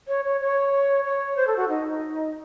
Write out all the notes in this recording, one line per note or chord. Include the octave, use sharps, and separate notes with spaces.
C#5
C#5
C#5
C#5
C5
A4
F#4
D#4